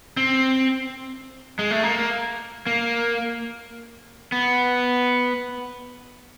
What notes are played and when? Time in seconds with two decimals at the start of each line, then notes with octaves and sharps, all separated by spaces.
0.17 C4
1.59 G#3
1.71 A3
1.83 A#3
2.67 A#3
4.32 B3